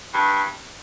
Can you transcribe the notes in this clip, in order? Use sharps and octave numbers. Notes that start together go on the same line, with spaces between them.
G2